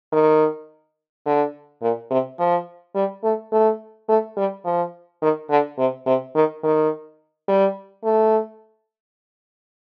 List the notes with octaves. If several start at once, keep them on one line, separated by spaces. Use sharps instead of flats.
D#3
D3
A#2
C3
F3
G3
A3
A3
A3
G3
F3
D#3
D3
C3
C3
D#3
D#3
G3
A3